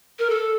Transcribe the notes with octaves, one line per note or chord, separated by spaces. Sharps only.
A#4
A4